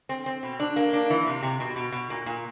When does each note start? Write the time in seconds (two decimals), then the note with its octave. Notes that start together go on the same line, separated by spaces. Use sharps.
0.09 C4
0.26 C4
0.43 B2
0.60 D4
0.76 A#3
0.93 D4
1.10 E3
1.27 C3
1.43 C3
1.60 B2
1.76 B2
1.92 B2
2.10 A#2
2.26 A#2